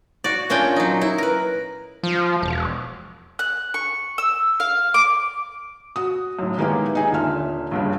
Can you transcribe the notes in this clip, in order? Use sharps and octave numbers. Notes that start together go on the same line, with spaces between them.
F#4 D5
A#2 C#4 D4 F4 G5
F#3 D#4
E4
A#4 B4
F3
E1
F#6
C#6
E6
F5
D6
F#4 D#6
F#2 A2
D#3 G#3 A#3 B3 E4 G4
D#4 G#4 D#5
D#1 A#2 D3 E5 F6
A#1 G2 C#3